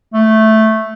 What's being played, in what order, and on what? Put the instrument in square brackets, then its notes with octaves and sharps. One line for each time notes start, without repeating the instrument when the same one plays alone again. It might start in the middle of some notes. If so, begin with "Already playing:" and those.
[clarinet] A3